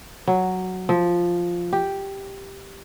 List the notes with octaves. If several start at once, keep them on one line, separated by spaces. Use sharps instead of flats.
F#3
F3
G4